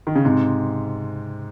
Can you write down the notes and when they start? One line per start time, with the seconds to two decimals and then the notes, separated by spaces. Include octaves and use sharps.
0.07 D#3
0.15 C#3
0.25 G#2 C3